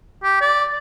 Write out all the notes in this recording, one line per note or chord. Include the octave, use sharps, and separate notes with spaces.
G4
D5